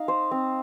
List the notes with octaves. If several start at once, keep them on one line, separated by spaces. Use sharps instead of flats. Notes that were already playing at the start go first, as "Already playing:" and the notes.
Already playing: D#4 F5
C5
C4